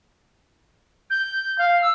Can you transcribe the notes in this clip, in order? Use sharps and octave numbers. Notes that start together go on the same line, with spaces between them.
G6
F5
E6